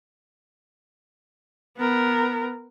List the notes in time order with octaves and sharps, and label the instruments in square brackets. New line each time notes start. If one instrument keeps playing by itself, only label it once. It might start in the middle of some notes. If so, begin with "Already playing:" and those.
[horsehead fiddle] B3 A#4